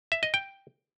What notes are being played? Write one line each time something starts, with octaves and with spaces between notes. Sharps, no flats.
E5
D#5
G5